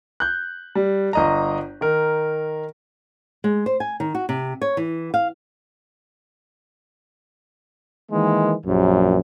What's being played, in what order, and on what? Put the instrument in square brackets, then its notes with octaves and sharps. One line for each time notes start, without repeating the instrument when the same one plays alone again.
[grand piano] F#6 G6
G3
G1 D#5 A#5
D#3 A#4
[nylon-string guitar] G#3
C5
G#5
D#3
F#4
C3
C#5
E3
F5
[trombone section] D#3 E3 G#3 A#3
A#1 F#2